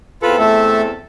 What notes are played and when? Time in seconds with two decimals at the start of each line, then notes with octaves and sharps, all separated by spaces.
0.22 E2 C4 F4 A4 B4
0.39 A3 E5